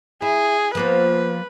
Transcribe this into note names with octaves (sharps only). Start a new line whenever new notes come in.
E4 G#4
F3 A#3 B3 B4